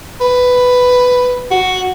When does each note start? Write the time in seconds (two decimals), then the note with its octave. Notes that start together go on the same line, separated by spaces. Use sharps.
0.21 B4
1.51 F#4